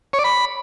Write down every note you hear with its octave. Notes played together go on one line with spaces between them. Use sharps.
C#5
D5
B5